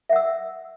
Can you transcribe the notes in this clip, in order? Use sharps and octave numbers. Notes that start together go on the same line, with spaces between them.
E5 F#5 E6